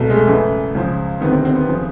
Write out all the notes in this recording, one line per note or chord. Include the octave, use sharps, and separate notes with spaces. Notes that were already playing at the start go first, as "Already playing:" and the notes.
Already playing: C2 B2 A3
G#3
A3
F#2 C#3 E3 A3
C#2 C#3 F3
D2 C3 D#3 B3
C4
C4
B3
C#3 F3